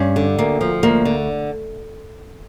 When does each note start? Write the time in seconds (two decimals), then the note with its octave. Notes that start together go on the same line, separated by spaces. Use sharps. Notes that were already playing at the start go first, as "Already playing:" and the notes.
Already playing: G2 C#4
0.16 D3
0.38 D2 A#3
0.61 F3
0.83 D2 A#3
1.05 D3